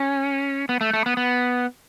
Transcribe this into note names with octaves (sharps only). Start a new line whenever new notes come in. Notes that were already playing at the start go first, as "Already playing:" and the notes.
Already playing: C#4
B3
A3
A3
B3
B3